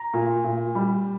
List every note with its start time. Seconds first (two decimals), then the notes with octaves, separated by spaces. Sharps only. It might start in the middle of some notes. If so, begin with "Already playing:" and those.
Already playing: A#5
0.14 A#2
0.44 A#2
0.75 G3